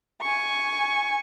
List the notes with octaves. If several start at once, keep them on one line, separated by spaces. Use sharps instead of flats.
G#5 C#6